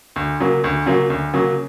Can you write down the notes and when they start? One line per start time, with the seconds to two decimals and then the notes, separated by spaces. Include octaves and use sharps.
0.16 D2
0.40 C#3 F#3 A#3
0.64 D2
0.86 C#3 F#3 A#3
1.10 D2
1.34 C#3 F#3 A#3